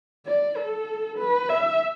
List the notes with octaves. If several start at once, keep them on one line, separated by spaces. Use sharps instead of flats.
D5
A4
B4
E5